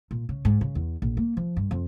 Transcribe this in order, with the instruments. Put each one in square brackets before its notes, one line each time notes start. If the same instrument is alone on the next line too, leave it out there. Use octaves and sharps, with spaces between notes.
[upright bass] A#2
C#3
G#2
C#3
E2
A#1
A#3
F3
G2
F2